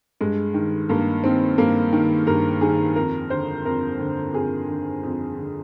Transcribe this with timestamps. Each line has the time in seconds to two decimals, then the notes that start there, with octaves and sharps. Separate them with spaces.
0.21 G2 G#3
0.54 D#3
0.89 G2 A#3
1.24 D#3 C4
1.58 G2 A#3
1.93 D#3
2.27 G2 A#4
2.61 D#3 G#4
2.96 F2 A#4
3.30 D3 C5
3.65 F2 A#4
3.99 D3
4.34 F2 G#4
4.68 D3
5.03 F2
5.37 D3